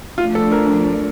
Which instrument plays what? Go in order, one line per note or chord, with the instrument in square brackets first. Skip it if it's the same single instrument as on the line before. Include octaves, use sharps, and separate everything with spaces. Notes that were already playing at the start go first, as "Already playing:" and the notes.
[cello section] F3 A3 D4 [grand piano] F4
[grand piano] A4
A#4